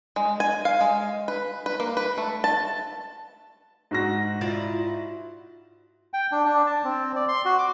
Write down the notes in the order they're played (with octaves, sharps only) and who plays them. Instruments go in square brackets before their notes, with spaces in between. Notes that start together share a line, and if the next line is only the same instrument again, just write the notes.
[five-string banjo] G#3
G#5
F5
G#3
B4
B4
A#3
B4
A3
A5
[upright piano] G#2 F#4 A#6
[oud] E4 F4 D5
[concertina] G5
D4
D4
A5
C4
D5
C6
F#4
D6